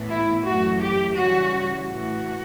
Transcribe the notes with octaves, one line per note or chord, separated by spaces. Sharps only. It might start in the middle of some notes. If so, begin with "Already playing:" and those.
Already playing: A2 E3 B3
E4
F#2 E3 A3 F#4
G4
C#3 E3 G3 C#4 F#4
A2 E3 A3 F#4